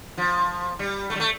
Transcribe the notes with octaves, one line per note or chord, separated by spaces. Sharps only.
F3
G3
A3
G3
A3